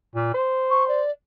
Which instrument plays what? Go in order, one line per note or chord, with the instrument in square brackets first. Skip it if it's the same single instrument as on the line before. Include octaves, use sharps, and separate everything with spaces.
[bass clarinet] A#2
C5
[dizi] C#6
D5